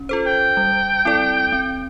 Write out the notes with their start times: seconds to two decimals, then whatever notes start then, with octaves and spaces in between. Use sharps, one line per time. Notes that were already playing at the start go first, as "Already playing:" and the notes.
Already playing: C#4
0.09 F4 A4 C5
0.26 G5
0.57 G3
1.05 C4 E4 A4 D5
1.52 C4